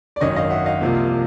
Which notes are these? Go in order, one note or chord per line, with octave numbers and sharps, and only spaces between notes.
D5
G#1 F#2 D#3 C#5 D#5
D#5 F5
E5 F#5
D#5 F5
C2 C3 F3 A#3